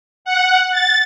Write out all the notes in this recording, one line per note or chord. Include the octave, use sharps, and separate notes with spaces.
F#5
A6